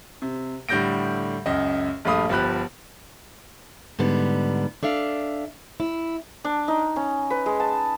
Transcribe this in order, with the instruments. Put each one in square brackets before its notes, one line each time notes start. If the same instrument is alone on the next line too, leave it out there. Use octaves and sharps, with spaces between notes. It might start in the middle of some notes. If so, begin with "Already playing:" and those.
[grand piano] C3
A2 D3 G3 G6 A#6 D7
C#2 F#2 D#5
A#1 G2 A3 F5 B5 D#6
G1 F3 G4 B5 F#6
[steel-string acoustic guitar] G#2 D3 G3 B3
D4 A4 E5 F5
E4
[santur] D4
D#4
C#4
B4
G#3
A5